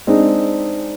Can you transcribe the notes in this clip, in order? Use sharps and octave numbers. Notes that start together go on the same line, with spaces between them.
G#3 C4 D4 D#4